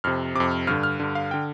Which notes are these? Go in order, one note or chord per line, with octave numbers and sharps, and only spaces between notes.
F2 C3 F6
F2 C3 D6
F6
G2 D3 F6
F6
G2 D3
F5
D3 G5